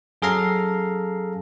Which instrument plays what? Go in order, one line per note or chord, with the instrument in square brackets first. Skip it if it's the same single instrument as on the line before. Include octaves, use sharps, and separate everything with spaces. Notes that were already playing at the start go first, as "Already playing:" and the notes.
[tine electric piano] F#2 G#4 A4 F5 A#5 C7